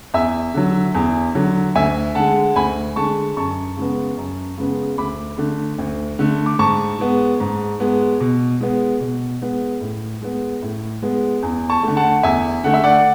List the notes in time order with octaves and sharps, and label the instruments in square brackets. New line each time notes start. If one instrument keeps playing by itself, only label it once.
[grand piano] E2 E5 G#5
D3 F#3
E2
D3 F#3
D2 E5 G#5
D3 G#3 F#5 A5
D2 G#5 B5
D3 G#3 A5 C#6
F#2 A5 C#6
C#3 G#3 B3
F#2
C#3 G#3 B3
D2 B5 D6
D3 A3
D2
D3 A3
D6
G#2 A5 C#6
G#3 B3
G#2
G#3 B3
B2
G#3 B3
B2
G#3 B3
A2
G#3 B3
A2
G#3 B3
E2
A5 C#6
D3 A3
F#5 A5
E2 E5 G#5
D3 A3 F#5
E5
D5 F#5